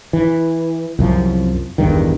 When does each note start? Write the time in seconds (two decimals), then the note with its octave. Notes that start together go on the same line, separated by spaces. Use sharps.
0.13 E3
0.99 C2 F#2 F3
1.78 A1 E2 G2 D#3